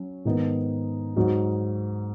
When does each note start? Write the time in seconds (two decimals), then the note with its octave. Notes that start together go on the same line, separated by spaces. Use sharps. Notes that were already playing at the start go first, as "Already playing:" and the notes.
Already playing: F#3 C#4
0.25 G#2 D#3 B3 D#4
1.16 G#2 F#3 D#4 F#4